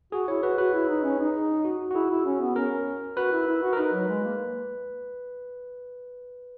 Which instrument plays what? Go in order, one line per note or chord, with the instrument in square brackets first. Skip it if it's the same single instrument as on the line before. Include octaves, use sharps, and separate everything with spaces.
[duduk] F#4 [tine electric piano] G#4
[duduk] E4 [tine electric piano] C#5
[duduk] F#4 [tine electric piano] B4
[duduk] F#4 [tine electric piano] B4
[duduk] E4
D#4
C#4
D#4
[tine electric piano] F#4
F#4
[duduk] E4 [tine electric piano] G#4
[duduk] E4
C#4
B3
[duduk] C#4 [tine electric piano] A#4
[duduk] F#4 [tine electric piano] B4
[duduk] E4
E4
F#4
[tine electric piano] A#4
[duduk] D#4 [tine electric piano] B4
[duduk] F#3
G#3
A#3